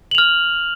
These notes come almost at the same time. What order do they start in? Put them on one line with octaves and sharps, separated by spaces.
F#7 F7 F6